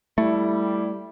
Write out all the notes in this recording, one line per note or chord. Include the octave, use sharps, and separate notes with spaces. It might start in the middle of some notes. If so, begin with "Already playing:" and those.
G3 A3 E4